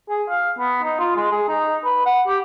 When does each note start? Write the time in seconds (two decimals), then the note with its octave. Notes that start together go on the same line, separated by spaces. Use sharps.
0.09 G#4
0.30 F5
0.58 B3
0.83 D#4
1.00 F4
1.16 G#3
1.32 G#4
1.48 D#4
1.84 B4
2.06 F#5
2.27 G4